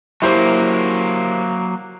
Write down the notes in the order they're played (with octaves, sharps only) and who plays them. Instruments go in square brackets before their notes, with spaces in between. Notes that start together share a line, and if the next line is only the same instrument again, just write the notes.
[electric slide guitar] F#3 A#3 [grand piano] E4 G4 C5